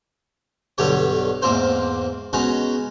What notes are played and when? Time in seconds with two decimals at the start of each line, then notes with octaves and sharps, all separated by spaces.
0.78 B1 G2 D3 G4 C#5
1.42 E2 G#2 A#3 C4 C5
2.33 G#3 B3 C#4 D#4 F#4